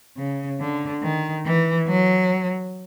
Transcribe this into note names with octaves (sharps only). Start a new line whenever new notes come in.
C#3
D3
D#3
E3
F#3